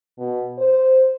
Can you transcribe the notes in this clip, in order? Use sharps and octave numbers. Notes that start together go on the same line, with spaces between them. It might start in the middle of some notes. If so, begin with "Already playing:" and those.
B2
C5